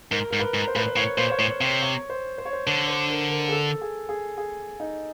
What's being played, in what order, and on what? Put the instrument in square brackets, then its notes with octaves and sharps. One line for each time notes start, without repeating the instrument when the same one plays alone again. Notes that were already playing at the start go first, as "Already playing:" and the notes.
[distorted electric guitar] G#2 [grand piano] A#4
[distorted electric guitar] G#2 [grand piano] A#4
[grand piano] B4
[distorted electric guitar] G#2
[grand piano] C5
[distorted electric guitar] A2 [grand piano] B4
[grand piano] C5
[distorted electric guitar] A2 [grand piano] C#5
[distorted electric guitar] A#2 [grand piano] C5
[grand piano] C#5
[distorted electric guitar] A2 [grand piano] C5
[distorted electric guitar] C3 [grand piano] C#5
[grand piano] C#5
C5
C5
C#5
C5
[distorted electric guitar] D3 [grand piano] C5
[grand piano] C5
A#4
A#4
G#4
A4
G#4
G#4
G#4
D#4